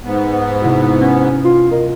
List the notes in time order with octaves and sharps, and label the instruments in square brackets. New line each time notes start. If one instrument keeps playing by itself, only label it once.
[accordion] G#2 B3
[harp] C3 E4 F#4
[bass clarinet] C#4
F4
[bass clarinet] A#4 [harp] D#5